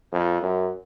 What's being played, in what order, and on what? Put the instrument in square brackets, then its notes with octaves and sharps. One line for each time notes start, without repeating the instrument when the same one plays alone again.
[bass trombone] F2
F#2